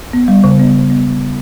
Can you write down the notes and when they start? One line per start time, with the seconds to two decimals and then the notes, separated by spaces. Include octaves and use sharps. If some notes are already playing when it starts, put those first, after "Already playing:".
0.13 B3
0.28 G3
0.44 C#3
0.60 B3
0.74 C#3
0.90 B3